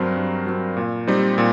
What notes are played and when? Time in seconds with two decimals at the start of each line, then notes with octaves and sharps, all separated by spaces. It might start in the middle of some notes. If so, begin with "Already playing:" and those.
Already playing: G2 F#3 C4 A#4
0.17 G2
0.47 F#3 C4
0.77 A#2
1.07 G3 C4 D#4
1.38 A#2